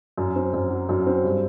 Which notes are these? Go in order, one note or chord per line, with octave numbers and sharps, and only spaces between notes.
F#2
C4
F#2
F#3
F#2
C4
G2